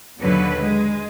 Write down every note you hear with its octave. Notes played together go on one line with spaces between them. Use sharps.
D#2 B2 D3 F#3 B4
G#3